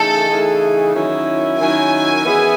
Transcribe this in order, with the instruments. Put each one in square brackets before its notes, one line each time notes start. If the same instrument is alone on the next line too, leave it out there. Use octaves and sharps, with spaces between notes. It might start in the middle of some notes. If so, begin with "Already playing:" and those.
Already playing: [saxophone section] C#3 E3 A3 D#4 G#4 [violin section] A4
[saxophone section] C#3 E3 A3 D#4 G#4
D#3 F#3 C#4 E4
[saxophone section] D#3 F#3 C#4 E4 [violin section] G#5
[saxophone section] E3 B3 E4 G#4